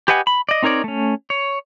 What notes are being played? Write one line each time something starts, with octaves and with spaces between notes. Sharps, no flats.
G4 B4 D#5 F#5 G#5
B5
D5 D#5
C4 D#4 A#4 C#5 D5
A3 C#4
C#5